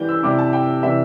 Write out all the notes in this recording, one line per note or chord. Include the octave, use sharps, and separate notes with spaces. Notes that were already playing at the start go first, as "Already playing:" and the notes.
Already playing: E3 G3 G6
E6
C3 G3 E4 D6
A5
G5
C3 E3 G3 E5